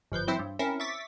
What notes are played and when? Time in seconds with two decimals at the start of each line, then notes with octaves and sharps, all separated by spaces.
0.12 G1 F3 B4 G6
0.27 E3 F#3 C4 E4 C5 E5
0.39 G2
0.59 C4 C#4 E4 A#4
0.80 E5 C#6 D6 A6 B6